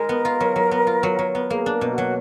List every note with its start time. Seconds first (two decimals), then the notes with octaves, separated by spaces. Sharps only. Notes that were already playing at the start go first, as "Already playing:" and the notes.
Already playing: G#3 D#4 A#4
0.09 B3
0.25 F4
0.40 F#3
0.56 F#3
0.71 B3
0.87 F4
1.03 F#3
1.19 F#3
1.35 B3
1.50 A#3 G#4
1.66 D4
1.71 A#4
1.81 B2
1.92 F#4
1.98 F#3